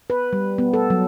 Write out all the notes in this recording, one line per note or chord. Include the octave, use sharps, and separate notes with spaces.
B4
G3
B3
A4
F#3